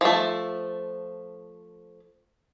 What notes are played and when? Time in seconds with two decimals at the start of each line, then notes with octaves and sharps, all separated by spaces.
0.01 F3 A3